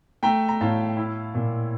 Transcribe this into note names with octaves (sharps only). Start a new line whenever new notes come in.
A3 G5 A#5
A#5
A2 F5 A5
E4
A#2